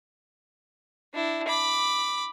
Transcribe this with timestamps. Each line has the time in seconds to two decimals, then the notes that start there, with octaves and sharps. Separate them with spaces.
1.14 D4 E4
1.48 B5 D6